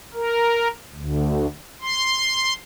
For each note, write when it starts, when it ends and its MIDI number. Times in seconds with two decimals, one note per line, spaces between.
0.14 0.68 70
0.93 1.46 38
1.81 2.53 84